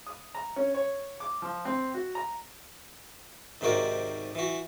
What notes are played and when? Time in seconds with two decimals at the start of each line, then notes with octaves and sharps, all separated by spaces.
0.07 D#6
0.35 A#5
0.56 C#4
0.74 C#5
1.20 D6
1.42 F3
1.65 C4
1.94 F#4
2.15 A#5
3.61 G#2 C3 D#3 F#4 A#4 D5
4.35 E3 F#4